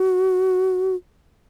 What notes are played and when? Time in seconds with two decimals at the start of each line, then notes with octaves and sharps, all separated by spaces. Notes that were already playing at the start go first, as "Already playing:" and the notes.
Already playing: F#4